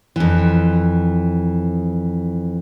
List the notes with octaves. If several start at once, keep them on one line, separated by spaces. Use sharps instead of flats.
F2 E3